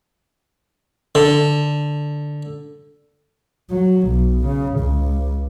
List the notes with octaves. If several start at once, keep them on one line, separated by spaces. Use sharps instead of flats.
D3
F#3
B1
C#3
C#2